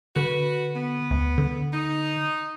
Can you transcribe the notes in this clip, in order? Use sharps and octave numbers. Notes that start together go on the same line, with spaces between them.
D3 F#4 B4
B3
D2
D3
D#4